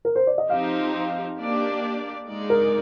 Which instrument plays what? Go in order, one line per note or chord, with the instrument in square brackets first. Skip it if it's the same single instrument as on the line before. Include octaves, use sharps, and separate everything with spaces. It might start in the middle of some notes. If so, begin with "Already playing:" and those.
[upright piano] A#4
C5
D5
D#5
[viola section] F3 C4 D#4 G4 C5 [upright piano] F5
[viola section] A#3 D4 G4 D5
G#3 D#4 G#4 D5
[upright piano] A#4